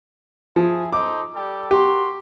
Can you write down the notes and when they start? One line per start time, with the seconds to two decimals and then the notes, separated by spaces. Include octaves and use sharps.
0.56 F3 E4 G#4
0.93 D#4 A4 C5 D6
1.34 G3 G4 A4
1.71 F#4 G4 A#4 C6